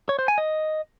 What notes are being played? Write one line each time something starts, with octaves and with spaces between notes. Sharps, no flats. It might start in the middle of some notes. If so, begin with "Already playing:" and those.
C#5
C5
G#5
D#5